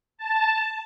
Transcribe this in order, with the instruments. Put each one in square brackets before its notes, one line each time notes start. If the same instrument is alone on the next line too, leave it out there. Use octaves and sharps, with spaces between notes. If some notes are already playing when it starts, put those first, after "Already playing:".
[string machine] A5